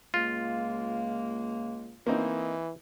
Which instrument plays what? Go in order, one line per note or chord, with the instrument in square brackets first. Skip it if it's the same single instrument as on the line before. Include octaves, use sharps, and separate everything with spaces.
[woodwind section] C#2 G#3 A#3 [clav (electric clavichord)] F4
[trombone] E3 [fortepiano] A#3 C4 D#4